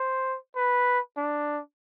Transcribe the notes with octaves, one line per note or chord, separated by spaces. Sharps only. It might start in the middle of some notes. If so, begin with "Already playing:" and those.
Already playing: C5
B4
D4